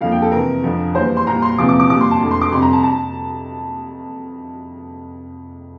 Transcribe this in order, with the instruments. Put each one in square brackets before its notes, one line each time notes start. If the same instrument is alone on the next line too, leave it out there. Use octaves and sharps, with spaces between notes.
[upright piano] F2 D3 F3 A#3 F5
G5
A4
E2 C3 E3 A#4
F2 D3 F3
E2 E3 G3 A#3 C5
C6
A#2 G3 A#3 A#5
C6
E2 C3 F3 A#3 D6
D6
D6
A#2 G3 A#3 D6
C6
A5
F2 D3 A3
C6
D6
F2 C3 G3 C6
A#5
A5
A5